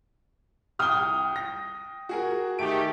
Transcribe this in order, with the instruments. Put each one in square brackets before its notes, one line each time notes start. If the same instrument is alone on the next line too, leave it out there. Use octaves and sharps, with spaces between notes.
[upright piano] C2 G7 [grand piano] G5 D#6 F6
[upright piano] A#6
F#4 G#4 A#4
[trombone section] D#3 A3 G4 [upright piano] D7